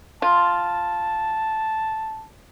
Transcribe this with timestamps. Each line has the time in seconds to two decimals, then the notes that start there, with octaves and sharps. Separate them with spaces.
0.22 F4 A5